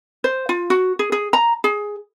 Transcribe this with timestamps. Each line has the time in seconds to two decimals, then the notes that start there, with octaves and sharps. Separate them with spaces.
0.24 C5
0.49 F4
0.70 F#4
0.99 G#4
1.12 G#4
1.33 A#5
1.64 G#4